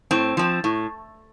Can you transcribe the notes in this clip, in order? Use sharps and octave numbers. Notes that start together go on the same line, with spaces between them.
A2 C4
F3 C4
A2